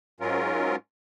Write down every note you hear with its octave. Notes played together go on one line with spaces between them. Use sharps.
G#2 F#3 C#4 F4 A#4